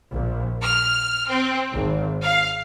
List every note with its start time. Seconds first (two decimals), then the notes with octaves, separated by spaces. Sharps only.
0.12 A#1
0.62 F6
1.28 C4
1.73 G#1
2.22 F5